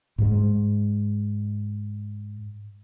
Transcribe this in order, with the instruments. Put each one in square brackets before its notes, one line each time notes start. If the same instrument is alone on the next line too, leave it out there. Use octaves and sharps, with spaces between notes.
[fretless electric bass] G#2 G#3